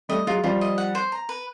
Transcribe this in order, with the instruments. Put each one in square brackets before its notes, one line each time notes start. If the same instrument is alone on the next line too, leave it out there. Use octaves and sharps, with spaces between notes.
[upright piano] G3 A3 [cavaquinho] D#5
[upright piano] F#3 G#3 [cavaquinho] F4
[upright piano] F3 G3 [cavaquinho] F4
[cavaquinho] D#5
F#5
C5
A#5
B4